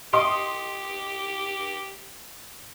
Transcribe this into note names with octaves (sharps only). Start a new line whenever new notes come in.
G4 D#5 C6 D#6